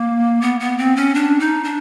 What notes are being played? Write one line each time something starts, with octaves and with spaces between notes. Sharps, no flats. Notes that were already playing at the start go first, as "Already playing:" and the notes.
Already playing: A#3
B3
B3
C4
C#4
D4
D#4
D4